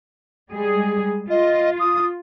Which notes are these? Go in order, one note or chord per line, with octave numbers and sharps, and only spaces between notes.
G3 G#3 G#4
F4 D#5
D#6